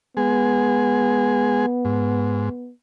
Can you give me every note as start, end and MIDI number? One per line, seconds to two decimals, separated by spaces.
0.17 1.66 56
0.17 2.71 59
0.17 1.66 68
1.85 2.49 44